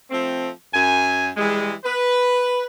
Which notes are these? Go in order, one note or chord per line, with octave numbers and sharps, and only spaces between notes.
F3 A3 C4
F#2 G#5
E3 G3 G#3
B4